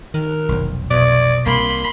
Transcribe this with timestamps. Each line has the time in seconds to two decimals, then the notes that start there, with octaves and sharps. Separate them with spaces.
0.14 D#3 A#4
0.49 F1 B1
0.91 B2 D5
1.46 C2 A#3 B5 C6